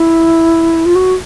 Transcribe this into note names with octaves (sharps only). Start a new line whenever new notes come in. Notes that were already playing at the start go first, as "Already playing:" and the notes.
Already playing: E4
F4
F#4